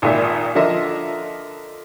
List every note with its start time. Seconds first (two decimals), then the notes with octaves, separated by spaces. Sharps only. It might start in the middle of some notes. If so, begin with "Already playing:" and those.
0.02 G#1 A#2 D#3 E5
0.55 D3 F3 A#4 D#5 E5